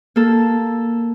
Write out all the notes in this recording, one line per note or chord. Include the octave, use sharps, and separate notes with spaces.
A#3 A4